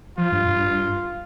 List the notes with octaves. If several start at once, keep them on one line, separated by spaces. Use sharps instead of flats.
F3 F4
G2
G2